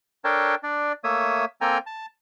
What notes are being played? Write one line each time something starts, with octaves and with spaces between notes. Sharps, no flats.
D4 A4 A#4 C#5 G5 A5
D4 D5
A3 A#3 C#5 E5 D#6
A#3 C4 A4 G5 G#5 A#5
A5